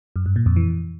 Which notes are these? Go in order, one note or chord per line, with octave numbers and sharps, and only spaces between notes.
F#2
G2
A#2
F2
E3